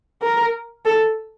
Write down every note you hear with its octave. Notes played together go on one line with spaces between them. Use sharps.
A#4
A4